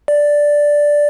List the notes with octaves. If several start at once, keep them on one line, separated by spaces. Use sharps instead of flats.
D5